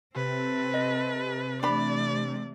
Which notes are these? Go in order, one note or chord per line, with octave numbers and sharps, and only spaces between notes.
C3 C4 A4 B4
D#5
E3 A3 D4 D5 B5